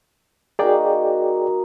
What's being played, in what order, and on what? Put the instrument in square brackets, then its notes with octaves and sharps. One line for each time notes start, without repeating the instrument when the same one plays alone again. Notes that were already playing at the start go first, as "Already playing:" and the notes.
[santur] A#3 D#4 F#4 [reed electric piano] G#4 D5 G5